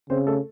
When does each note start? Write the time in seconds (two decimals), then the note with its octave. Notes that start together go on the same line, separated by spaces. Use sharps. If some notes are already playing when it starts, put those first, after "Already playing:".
0.10 C#3 C4 C5
0.27 A3 A4